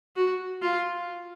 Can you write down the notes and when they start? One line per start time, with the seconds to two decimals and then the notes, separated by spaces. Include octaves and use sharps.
0.16 F#4
0.62 F4